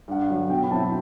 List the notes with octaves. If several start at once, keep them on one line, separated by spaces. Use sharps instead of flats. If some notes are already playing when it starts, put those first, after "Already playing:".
G2 F#5
D3 F#3
B2 G5
B5
F#3 C4 E4 A5